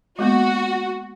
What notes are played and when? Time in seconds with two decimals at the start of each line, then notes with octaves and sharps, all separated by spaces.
0.19 G#3 A#3 B3 F#4